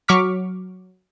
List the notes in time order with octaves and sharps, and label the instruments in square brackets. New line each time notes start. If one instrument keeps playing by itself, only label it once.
[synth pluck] F#3 C#6 D6 F6 B6